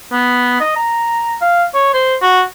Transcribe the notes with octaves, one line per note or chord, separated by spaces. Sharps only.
B3
D#5
A#5
F5
C#5
C5
F#4